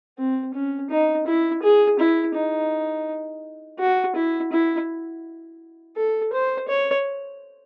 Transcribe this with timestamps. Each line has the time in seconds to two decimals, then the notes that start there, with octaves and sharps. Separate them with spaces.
0.18 C4
0.54 C#4
0.90 D#4
1.26 E4
1.62 G#4
1.99 E4
2.35 D#4
3.79 F#4
4.15 E4
4.52 E4
5.96 A4
6.33 C5
6.68 C#5